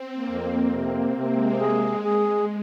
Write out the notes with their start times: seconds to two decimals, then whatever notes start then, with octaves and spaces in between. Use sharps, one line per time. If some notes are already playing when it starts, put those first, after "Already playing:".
Already playing: C4
0.14 A#3
0.28 F2
0.44 A#3
0.73 C3 C4
1.03 A#3
1.17 C3
1.32 G#3
1.61 G#3 G#4
2.05 G#4